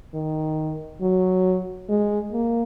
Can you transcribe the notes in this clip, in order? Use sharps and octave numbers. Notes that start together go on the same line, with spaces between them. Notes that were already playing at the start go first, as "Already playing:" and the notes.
D#3
F#3
G#3
A#3